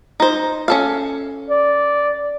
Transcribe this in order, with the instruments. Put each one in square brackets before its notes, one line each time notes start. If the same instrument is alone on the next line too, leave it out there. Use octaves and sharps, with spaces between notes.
[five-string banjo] D#4 C5
C#4 A4 F5
[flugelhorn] D5